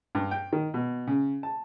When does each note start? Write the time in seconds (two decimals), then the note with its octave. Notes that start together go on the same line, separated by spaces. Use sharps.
0.15 G2
0.31 G5
0.53 D#3
0.74 B2
1.07 C#3
1.43 A5